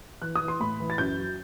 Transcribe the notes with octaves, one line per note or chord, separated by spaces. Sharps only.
E3 F#6
D#6
E3
C6
A2 B5
E3
A6
F#2 G6
F#3